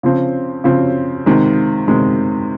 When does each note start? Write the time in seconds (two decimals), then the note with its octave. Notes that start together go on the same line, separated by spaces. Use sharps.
0.03 C#3 F3 C4
0.64 C#3 F3 C4
1.26 C3 D#3 G#3
1.88 C3 D#3 G#3